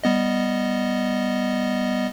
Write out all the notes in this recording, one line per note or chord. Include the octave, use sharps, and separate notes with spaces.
G3 B3 D#5